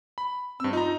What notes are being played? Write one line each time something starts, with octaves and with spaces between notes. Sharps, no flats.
B5
G2 C4 E6
D#4 F4 A#5